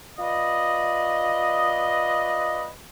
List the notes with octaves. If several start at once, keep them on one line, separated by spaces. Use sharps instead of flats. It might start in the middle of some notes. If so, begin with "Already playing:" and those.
F4 B4 D5 D#5